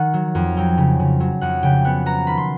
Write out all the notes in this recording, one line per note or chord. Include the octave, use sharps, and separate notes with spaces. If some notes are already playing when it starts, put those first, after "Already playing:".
Already playing: D#3 F#5
F#3
F2
F#3 G5
C#3
C#3
F#3
F2 F#5
C#3 G5
B3 F#5
B3 A#5
D#3 B5
C6